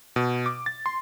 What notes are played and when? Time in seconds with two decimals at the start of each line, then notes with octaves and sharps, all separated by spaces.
0.16 B2
0.46 D6
0.66 A6
0.86 C6